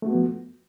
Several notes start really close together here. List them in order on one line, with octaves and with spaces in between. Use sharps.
A3 F#4 B3 F3